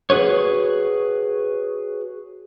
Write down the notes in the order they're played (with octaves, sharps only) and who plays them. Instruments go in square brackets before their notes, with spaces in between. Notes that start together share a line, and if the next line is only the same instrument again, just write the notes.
[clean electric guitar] F#4 G#4 B4 C#5